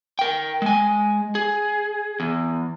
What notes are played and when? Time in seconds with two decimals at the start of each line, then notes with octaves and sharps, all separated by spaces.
0.19 A#4 G5
0.62 G#3 G#5
1.35 G#4
2.20 E2